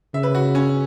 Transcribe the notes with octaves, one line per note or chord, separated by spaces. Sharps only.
C#3 E5
B4
F#4
C#4